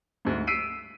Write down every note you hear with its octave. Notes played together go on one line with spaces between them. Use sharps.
D2 G#2
E6 B6 C7 D7 D#7